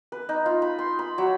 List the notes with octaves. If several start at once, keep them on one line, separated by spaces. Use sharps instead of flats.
B4
D#4
F4
B5
C6
B5
F#3